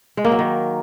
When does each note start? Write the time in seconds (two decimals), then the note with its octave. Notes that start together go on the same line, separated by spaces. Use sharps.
0.17 G#3
0.25 A#3
0.32 F#3
0.39 D#3